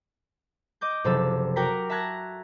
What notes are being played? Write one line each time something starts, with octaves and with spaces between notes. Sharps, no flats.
D#5 D6 G6
F#1 C3 F3 A4 E6
F#4 A#4 G5 A#5 D6 B6
E5 A5 A#5 F#6 G#6 A#6